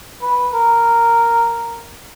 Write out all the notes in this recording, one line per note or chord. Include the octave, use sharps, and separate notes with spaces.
B4
A#4